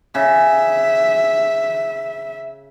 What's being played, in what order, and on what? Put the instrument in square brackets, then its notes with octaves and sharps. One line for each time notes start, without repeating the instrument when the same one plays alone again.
[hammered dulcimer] C#3 [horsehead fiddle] E5